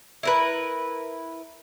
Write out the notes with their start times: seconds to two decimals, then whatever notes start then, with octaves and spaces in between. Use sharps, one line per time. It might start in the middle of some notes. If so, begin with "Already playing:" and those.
0.23 E4 A#4 B4